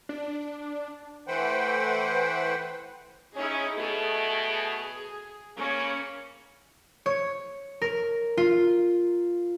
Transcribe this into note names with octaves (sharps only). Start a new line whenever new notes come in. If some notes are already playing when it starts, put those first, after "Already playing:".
D4
E3 A3 B4 C5 F#5 G5
C#4 D#4 E4 G#4
B2 A3 G#4
C#3 A#3 C#4
C#5
A#4
F4